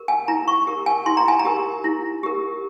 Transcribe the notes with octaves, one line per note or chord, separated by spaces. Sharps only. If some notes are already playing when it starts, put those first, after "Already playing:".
Already playing: G4 A#4
G#5
E4 A#5
C#6
G4 A#4
G#5
E4 C6
A#5
G#5
A#5
G4 A#4
E4
G4 A#4